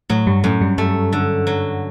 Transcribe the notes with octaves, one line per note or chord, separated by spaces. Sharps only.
A2 F#3 A3
G2 G3
F#2 A2 A3
G2 G3
G2 G3 A3
D3
F#3